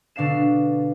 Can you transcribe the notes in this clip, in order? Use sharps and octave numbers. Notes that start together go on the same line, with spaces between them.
B2 D3 D4 F5 C7 E7